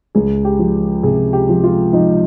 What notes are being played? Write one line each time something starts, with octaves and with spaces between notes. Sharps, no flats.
C#2 G#4
G4
F3
C3 G#4
G4
F3
F4
F3 D#4